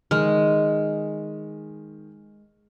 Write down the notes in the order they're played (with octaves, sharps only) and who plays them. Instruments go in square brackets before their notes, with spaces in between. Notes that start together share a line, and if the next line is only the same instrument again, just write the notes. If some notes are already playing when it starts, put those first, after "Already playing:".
[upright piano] D#3 F6 [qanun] G#3